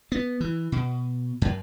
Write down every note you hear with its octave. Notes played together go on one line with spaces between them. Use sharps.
B3
E3
B2
F#2